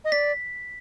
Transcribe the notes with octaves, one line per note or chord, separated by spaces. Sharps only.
D#5
D5 B6